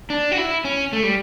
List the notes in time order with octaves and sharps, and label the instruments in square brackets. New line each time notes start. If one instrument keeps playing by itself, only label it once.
[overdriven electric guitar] D4
F#4
E4
C#4
A3
G3